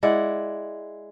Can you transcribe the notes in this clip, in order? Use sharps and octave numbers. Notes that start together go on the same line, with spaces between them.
G#3 E4 D5 F#5